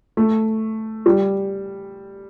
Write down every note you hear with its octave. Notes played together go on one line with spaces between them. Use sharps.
A3
G3